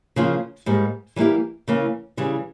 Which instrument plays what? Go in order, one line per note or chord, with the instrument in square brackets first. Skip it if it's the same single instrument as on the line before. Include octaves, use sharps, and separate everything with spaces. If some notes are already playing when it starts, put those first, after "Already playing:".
[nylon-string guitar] C#3 F3 A#3 F4
G#2 G3 A#3
E3 G3 A#3 E4 G4
C#3 E3 A#3
C#3 E3 G3